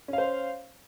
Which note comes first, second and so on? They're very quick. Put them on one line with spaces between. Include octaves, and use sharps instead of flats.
C#4 F5 C5